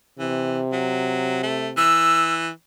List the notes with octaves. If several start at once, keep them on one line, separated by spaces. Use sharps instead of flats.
C3 E3
F#3
A3
E3 E6